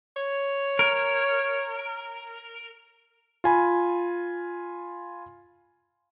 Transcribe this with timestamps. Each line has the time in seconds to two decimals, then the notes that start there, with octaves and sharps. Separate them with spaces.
0.17 C#5
0.79 A#4
3.44 F4 G#5 B5